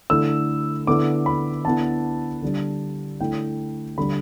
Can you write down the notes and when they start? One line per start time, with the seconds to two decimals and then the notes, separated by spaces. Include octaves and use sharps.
0.10 D3 A3 E4 E6
0.87 D3 B3 E4 D6
1.26 B5
1.65 D3 B3 E4 A5
2.42 D3 G3 D4
3.20 D3 A3 E4 G5
3.98 D3 G3 D4 B5